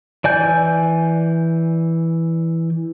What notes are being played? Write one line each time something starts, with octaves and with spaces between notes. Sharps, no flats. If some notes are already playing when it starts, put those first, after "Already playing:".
E3 D5 G#5 G6